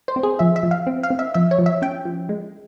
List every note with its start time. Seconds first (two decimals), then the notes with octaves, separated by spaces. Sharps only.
0.08 C5
0.16 C4
0.23 G#4
0.39 F3 E5
0.56 E5
0.63 F3
0.71 F5
0.87 C4
1.03 F5
1.10 C4
1.19 E5
1.34 F3 E5
1.51 C#5
1.59 F3
1.66 E5
1.82 C#4 G5
2.05 F3
2.29 G#3